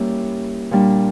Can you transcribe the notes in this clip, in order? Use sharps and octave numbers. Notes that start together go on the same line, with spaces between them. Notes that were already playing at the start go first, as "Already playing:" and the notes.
Already playing: G3 A#3 C#4 E4 G4
A#2 G3 D4